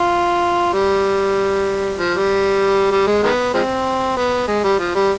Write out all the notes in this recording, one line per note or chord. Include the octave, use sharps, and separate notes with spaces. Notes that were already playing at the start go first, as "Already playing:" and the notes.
Already playing: F4
G3
F3
G3
G3
G#3
D#3 G#3 B3
F3 G#3 C4
B3
G#3
G3
F3
G3